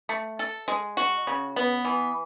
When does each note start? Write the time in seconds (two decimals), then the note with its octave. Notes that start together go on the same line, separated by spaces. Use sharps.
0.09 A3
0.39 A4
0.68 G#3
0.97 F#4
1.27 C#3
1.56 B3
1.85 E3